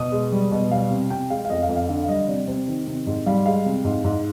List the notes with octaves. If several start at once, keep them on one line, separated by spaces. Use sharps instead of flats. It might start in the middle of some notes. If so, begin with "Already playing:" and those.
Already playing: B2 D#6
G#3
G3
B2
G3 F5
C3
C3 G5
G#3 F5
F5
F2 D#5
F5
F2
F5
D3 F5
F5
G3 D#5
C3 D5
C3 C5
D#3
C3
G#2
G3 F5
G#3 F5
C3
G#2
G#2